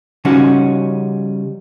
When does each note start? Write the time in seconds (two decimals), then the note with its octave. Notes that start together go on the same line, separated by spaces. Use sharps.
0.25 C#3 F3 G3 C#4 D#4 F#4